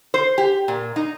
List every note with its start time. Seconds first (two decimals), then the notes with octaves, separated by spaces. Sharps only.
0.14 C5
0.38 G4
0.68 A#2
0.96 D#4